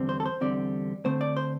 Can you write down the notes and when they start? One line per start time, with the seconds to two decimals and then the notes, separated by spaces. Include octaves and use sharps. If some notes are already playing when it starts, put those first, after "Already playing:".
Already playing: E2 D3 G3 C4
0.09 C5
0.20 A4
0.26 C5
0.41 E2 D3 G3 C4 D5
1.04 D2 D3 A3 C4 C5
1.21 D5
1.37 C5